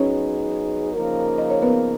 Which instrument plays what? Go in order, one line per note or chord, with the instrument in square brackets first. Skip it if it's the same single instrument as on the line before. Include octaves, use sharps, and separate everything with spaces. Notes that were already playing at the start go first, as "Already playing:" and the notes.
Already playing: [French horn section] F#3 B3 D#4 G#4 [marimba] C#4 C#5
[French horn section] C#3 F3 A#3 D#4 A#4
[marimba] D#5
C#5
B3 B4